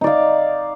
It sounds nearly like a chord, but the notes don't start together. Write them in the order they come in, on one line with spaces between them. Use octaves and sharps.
D#4 D5 F5